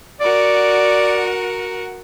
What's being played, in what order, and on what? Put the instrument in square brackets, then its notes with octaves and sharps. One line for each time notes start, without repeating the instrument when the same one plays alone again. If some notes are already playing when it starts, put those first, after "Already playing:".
[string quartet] F#4 A#4 F#5 [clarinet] D5